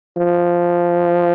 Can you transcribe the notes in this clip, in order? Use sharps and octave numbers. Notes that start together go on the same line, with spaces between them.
F3